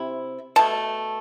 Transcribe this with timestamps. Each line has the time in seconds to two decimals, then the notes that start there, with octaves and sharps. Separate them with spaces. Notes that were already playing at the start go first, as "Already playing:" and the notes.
Already playing: C3 C4 E4
0.56 B2 A3 A5